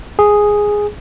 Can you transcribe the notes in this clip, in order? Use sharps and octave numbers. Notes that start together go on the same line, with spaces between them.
G#4